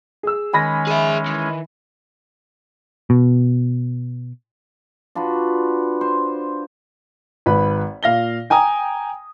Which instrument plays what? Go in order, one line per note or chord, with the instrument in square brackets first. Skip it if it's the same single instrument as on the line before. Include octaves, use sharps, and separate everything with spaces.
[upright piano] G#4 E6
[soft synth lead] D#3 [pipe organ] G#3 C#4 [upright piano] G#5 B5 A#6
[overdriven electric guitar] G#4 E5
E3
[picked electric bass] B2
[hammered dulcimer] D4 F4 F#4 B4
C5
[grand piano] G#1 B4 B5
A#2 F5 A#6 G7
G5 G#5 A#5 D#6